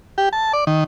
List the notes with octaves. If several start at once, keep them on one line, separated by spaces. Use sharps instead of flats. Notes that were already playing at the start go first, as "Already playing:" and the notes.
G4
A5
D5
D#3